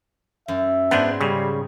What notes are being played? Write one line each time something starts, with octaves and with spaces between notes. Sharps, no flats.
F#2 E5
G#2 B3 D4 C5 G#5
C#3 G3 G#5